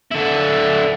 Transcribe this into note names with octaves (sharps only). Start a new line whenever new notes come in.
D3 E4